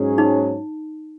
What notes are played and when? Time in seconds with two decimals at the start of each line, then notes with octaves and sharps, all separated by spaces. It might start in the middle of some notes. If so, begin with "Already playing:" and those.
Already playing: G#2 F#3 C#4 G#4
0.18 D#4